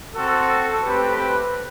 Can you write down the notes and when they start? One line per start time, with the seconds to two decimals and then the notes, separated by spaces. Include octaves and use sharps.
0.14 C4 F#4 A4
0.83 A3 C4 G4 B4